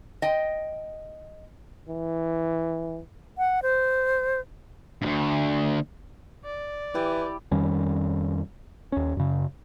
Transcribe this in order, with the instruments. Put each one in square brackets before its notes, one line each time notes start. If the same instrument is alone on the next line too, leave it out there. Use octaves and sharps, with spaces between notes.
[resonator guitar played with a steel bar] D#5 G5
[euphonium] E3
[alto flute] F#5
C5
[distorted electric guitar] D2 G2
[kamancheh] D5
[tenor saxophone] E3 [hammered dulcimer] E4 G4
[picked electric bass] F2 D#3 G3 C#4
D#2 C#4
F#2 C#3